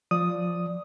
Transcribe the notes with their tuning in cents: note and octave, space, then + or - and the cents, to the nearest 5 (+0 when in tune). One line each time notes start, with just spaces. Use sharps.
F3 +0 D5 +0 D#6 +0